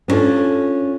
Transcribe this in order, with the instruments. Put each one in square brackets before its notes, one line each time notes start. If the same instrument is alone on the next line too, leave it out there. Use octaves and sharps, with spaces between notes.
[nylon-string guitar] B3 C#4 D4 F4 A4